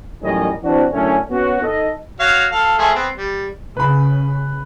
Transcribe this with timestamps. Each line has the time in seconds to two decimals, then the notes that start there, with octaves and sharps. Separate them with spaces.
0.22 A1 F#2 D#3 G3 C#4 D#5
0.63 E3 C4 D4 F#4
0.92 F#2 A2 D3 A3 C#4
1.30 B3 C#4 F#4
1.61 D#4 A4 D#5
2.20 F#4 C#5 F5
2.52 A4 F5
2.79 F3 A3 G#4
2.95 B3 C4
3.16 G3
3.77 C#3 B4 B5